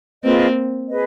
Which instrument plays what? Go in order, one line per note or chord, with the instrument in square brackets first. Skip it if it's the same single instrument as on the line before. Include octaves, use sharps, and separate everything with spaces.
[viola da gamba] A#3 C4 [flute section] F4 G#4 B4 D#5
[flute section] G#4 B4 D#5